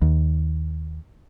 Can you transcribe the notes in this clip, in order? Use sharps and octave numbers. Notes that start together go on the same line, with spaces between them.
D#2